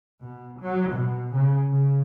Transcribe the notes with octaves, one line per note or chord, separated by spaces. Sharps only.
B2
F#3
B2
C#3
C#3